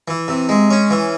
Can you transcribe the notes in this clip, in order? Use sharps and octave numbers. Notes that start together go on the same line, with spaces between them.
E3
C3
G#3
C#4
E3